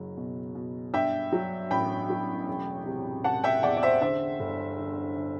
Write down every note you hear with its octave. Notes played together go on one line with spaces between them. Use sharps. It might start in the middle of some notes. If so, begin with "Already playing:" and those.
Already playing: F#1 F#3
B2
B2
G2 E5 G5
F#3
A1 G5 B5
F#3
E1
C3
C3 F#5 A5
E5 G5
E2 D5 F#5
D5
C5 E5
D3 C5 E5
G1
D3
D3